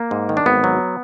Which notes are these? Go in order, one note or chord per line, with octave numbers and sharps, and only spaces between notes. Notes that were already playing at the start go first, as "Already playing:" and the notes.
Already playing: A#3
G#2
D#3
D4
G#1 B3
F#3